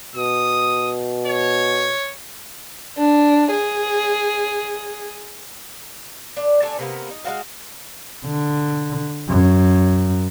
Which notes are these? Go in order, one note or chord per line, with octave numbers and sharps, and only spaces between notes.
B2 D#6
C#5
D4
G#4
D4
A3 D4 A4 G#5
C3 A#3 B3
D#4
G#3 C4 F#4 F5
D3
F#2